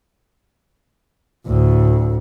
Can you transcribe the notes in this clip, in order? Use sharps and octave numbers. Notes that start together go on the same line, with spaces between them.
D2 A2